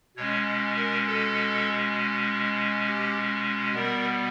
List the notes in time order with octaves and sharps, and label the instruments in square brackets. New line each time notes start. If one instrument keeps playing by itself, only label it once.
[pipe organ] B2 G#3 C#4 C#5
A#4
A4
G4
B2 G3 B3 A#4